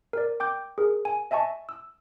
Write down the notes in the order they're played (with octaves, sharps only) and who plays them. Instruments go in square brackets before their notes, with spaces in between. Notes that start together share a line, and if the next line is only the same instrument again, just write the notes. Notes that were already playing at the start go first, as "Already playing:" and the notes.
[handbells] A#4 D5
G5 D6 G6
G#4 A#4
G#5
D#5 E5 G#5 A5 C#6
E6